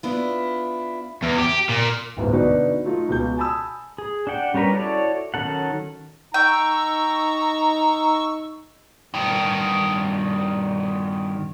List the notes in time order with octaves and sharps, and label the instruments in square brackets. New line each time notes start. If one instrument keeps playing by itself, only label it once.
[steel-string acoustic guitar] B3 D4 E4 F4
[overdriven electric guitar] E2
G4
A#2
[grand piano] D1 G1 C#2 G#2 G#3
B2 D3 F#3 D4 D#4 B4
F#3 A3 D#4 F4
C#2 B2 G4 G6
G#5 A5 B5 D#6 E6
[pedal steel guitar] G#4
D4 G4 F#5 G5
G3 C#4 G4 A#4 B4
E4 F#4 A4 C#5 D5
D#3 F#3 C#4 A4 F#5
[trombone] D#4 [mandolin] G5 [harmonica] A#5 [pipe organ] C#6 E6
[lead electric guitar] G2 D#3